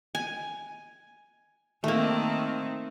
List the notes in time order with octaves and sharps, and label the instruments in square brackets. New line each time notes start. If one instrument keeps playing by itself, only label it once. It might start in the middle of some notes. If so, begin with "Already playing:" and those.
[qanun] G#5
[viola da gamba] D#3 C4 [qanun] A3 A#3